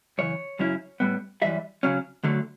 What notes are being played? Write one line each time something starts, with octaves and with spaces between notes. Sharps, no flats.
F#2 C#3 E3 C#5
F#2 C#3 F#3 C#4 E4
A2 G3 B3
F#2 E3 G3 E5
C#3 F#3 C#4
D2 D3 F#3 A3